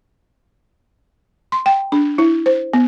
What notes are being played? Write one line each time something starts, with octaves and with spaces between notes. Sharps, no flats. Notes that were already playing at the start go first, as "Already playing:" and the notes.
C6
G5
D4
E4
C5
B3